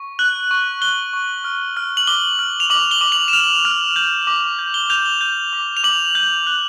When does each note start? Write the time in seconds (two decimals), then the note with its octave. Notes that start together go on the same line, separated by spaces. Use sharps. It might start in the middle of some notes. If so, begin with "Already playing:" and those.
Already playing: C#6
0.19 F#6 F#7
0.51 C#6
0.82 F#6 G7
1.13 C#6
1.44 F6
1.77 F6
1.97 F#7
2.07 D6 G7
2.39 F6
2.60 F7
2.70 D6 F#7
2.91 G7
3.01 D6
3.12 F#7
3.28 E7
3.33 F6 F7
3.65 F6
3.96 G6 F#7
4.27 D6
4.59 G6
4.74 G7
4.90 G6 F7
5.06 G7
5.21 G6
5.53 D6
5.77 F7
5.84 D6 F#7
6.15 G6
6.47 F#6